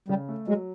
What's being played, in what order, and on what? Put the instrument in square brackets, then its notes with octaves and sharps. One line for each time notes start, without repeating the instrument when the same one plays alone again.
[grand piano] C#3 [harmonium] G3
[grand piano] A3
[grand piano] F#3 [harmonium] G#3